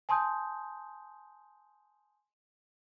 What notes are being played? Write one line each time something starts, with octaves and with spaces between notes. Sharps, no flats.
G#5 A5 C6 D#6 G6